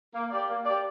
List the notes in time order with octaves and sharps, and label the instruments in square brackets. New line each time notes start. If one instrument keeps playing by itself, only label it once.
[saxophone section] A#3
G4 D5
A#3
G4 D5